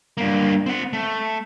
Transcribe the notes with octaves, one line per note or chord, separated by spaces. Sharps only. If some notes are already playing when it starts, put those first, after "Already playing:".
G2 A#3
C4 F#5
A3